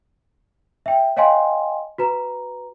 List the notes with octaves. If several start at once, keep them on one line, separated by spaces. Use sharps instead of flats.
E5 G5
C#5 D#5 F5 G5 G#5 C6
F#4 B4 A#5